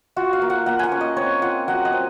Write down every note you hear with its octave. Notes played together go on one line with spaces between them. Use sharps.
F4 F#4
F5
A#3
F#5
A#3 F#5
F#5 G#5
C#4
D#5
C4 C#5
F4 F#5
F#3 F#5
D#5
C4